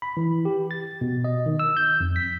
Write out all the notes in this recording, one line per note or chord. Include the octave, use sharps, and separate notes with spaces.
B5
E3
G4
A6
B2
D#5
D#3
E6
G6
F2
B6